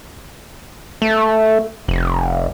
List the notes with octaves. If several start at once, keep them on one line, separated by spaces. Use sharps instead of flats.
A3
F1